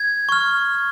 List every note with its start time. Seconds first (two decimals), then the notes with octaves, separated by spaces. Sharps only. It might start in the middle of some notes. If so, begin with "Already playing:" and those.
Already playing: G#6
0.29 C#6 F6